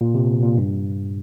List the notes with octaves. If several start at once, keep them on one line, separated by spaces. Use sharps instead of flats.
A#2
C3
A#2
G2